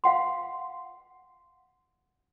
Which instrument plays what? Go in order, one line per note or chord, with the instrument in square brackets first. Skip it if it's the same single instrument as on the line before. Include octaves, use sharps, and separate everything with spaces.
[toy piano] F5 F#5 C6